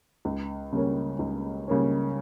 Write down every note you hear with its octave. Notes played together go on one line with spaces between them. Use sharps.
C#2
C#3 G3 A#3 C#4
C#2
C#3 G3 A#3 C#4